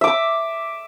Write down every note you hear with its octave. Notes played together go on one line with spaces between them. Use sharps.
E5 D6